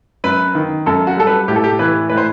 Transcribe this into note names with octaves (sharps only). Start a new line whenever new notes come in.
F#2 B4
D#3
F#2 A4
F#4
G3 A4
B4
A2 G4
A4
G4
E3 B4
A2 B4
C5